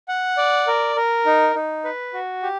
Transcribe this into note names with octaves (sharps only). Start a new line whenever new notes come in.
F#5
D5
A#4
A#4
D#4
D#4
B4
F#4
G4